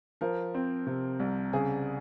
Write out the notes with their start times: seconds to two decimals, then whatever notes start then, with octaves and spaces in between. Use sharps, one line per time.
0.21 F3 A#4
0.54 C4
0.87 C3
1.20 C2
1.53 C#3 G#4